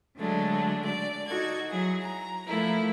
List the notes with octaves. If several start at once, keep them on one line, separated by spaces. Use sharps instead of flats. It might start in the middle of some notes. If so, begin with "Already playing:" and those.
D3 F#3 G#3 A3 D4
D5
D#4 F#4 A4 G#6
F#3 E4 G#4
A#5
F3 A3 A#3 E4